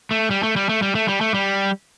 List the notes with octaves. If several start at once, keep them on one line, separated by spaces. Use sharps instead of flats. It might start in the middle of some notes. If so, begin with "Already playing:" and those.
A3
G3
A3
G3
A3
G3
A3
G3
A3
G3